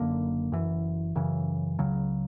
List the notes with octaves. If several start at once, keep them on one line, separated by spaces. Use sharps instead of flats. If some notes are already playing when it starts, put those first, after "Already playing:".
Already playing: F#1 F#2 D3 A#3
F#1 F#2 E3
F#2 C#3 E3
C#2 C#3 F#3